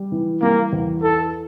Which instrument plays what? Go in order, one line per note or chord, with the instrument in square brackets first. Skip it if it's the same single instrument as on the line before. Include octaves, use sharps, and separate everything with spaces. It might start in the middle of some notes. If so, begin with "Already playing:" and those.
Already playing: [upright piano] G3
E3
[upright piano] G3 [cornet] A#3
[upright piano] E2
[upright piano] E4 [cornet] A4